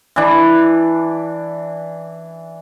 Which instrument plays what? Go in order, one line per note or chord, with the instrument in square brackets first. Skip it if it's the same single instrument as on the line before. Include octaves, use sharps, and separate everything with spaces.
[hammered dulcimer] E3 D4